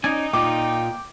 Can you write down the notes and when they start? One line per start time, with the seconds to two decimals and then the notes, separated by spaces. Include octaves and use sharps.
0.04 C#4 D#4 D5 G#5
0.33 A#2 F4 G5 D6